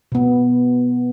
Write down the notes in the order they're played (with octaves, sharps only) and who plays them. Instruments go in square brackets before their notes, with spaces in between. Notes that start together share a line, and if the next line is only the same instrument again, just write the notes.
[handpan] B2 B3